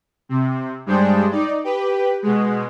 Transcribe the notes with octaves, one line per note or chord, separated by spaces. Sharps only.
C3
G2 G3 G#3 D4 C5 G5
D#4 D5
G4 B4
B2 G#3